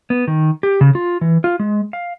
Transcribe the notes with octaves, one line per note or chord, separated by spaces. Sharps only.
B3
D#3
G4
C#3
F4
E3
F4
G#3
F5